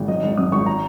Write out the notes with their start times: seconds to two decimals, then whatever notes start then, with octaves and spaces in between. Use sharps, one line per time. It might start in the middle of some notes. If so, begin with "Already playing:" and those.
Already playing: G#1
0.08 F#3 D#5
0.23 G#1
0.37 F#2 D#6
0.52 G#1 C#6
0.66 A#5